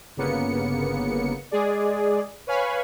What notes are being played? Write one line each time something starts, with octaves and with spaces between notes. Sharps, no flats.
G1 C#3 A#3 B3 C#7
G#3 G#4 D5
B4 C#5 F5 G#5 B5 C#6